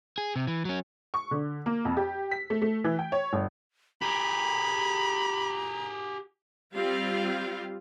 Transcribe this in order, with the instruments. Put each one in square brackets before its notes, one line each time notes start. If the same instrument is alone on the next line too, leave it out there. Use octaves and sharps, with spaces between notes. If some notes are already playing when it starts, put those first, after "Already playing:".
[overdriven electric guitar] G#4
C3
E3
F#3 C#4
[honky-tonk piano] C#6
D3
A#3
F2
G4
B6
A3
A3
E3
G5
C#5
G1
[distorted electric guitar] G4 G#4 [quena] A#5 [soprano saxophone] B5
[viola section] G3 C4 F4 G4 F5